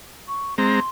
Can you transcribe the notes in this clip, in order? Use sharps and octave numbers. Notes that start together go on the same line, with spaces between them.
C#6
G#3 C4 A#5 C6